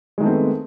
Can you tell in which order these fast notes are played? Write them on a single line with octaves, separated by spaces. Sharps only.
G#3 D#3 A3 C4 B3